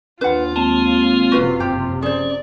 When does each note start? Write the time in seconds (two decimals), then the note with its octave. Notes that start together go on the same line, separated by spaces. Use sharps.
0.21 D#2 D4 F4 B4 F#5
0.56 G#3 A#3 C4 A5
1.32 F#1 C3 F3 F#4 B4 F5
1.60 G2 G4
2.03 C#4 G#4 C5 D5